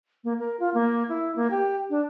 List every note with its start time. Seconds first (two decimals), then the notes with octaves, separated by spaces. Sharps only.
0.24 A#3
0.39 A#4
0.60 F4
0.74 A#3
1.09 E4
1.36 A#3
1.51 G4
1.90 D4